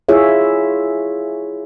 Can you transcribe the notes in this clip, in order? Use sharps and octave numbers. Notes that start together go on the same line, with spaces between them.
E4 F4 G#4 C#5 E5